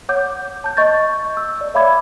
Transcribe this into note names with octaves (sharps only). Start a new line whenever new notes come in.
C#5 F#5 D6 G6
A5 G6
D#5 C#6 G6 A6
E6
D5
C#5 E5 F5 B5 D6 G#6